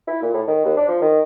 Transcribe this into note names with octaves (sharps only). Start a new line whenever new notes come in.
E4
A#2
A2
D#3
D#2
D4
F3
D#3